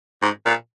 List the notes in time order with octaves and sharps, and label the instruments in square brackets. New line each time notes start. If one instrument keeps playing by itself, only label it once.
[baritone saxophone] G#2
A#2